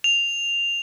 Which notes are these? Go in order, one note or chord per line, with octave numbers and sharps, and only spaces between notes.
F7